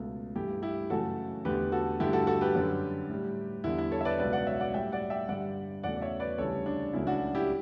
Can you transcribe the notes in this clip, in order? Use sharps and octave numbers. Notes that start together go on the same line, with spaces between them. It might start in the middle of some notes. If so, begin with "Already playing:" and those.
Already playing: C#2 B2 A3
G2 E3 A3 E4 G4
E4 G4
F#2 C#3 E3 A3 F#4 A4
E2 D3 A3 G4 B4
F#4 A4
G2 D3 A3 E4 G4
F#4 A4
F#4 A4
G4 B4
F#2 D3 G3
A2 G3
E2 D3 G3 E4
E4
A4 C#5
E5
B4 D5
C#2 B2 F#3 B4 D5
D5 F#5
C#5 E5
D5 F#5
A2 G3 E5 G5
D5 F#5
E5 G5
G2 D3 G3 D5 F#5
E2 C#3 F#3 A3 D5 F#5
D5
C#5 E5
B4 D5
D2 C#3 E3 G3 A4 C#5
D4
C#2 C#3 F#3 A3 E4
D4 F#4
E4 G4